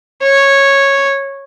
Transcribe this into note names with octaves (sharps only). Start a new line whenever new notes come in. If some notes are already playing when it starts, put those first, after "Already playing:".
C#5